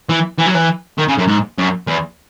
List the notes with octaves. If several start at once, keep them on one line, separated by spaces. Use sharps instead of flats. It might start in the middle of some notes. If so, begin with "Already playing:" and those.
E3
E3
F#3
E3
D#3
C#3
F#2
G#2
F#2
E2